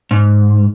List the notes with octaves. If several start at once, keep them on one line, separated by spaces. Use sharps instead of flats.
G#2